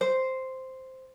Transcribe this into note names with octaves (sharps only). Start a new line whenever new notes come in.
C5